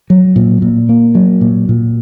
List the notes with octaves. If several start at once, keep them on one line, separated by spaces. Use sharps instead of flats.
F#3
A#2
A#2
A#3
F#3
A#2
A#2